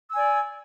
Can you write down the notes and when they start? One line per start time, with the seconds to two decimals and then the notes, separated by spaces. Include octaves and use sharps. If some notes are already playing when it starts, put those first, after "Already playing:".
0.10 E6
0.13 G#5
0.17 D5